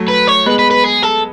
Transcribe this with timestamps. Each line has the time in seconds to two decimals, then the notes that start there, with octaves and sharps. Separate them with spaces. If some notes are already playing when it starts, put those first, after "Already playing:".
Already playing: F#3 A3
0.08 B4
0.27 C#5
0.46 G#3 B3 B4
0.59 B4
0.71 B4
0.84 G#4
1.03 A4